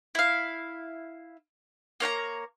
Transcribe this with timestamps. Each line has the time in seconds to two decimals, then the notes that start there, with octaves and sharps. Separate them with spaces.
0.15 E4 F5
2.00 A#3 C#5 G5 A#5